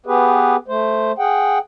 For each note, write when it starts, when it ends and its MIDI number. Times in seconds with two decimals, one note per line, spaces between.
0.06 0.56 59
0.06 0.56 67
0.06 0.56 68
0.06 0.56 71
0.68 1.12 57
0.68 1.12 72
1.19 1.58 68
1.19 1.58 78
1.19 1.58 79